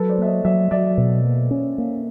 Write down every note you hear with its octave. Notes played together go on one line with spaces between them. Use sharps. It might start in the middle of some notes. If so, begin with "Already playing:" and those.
Already playing: F#3 A4 B4
C5 D5
A#3 E5
C#5 D#5
F#3 D5 E5
F#3 D5 E5
B2
A#3
C#4
A#3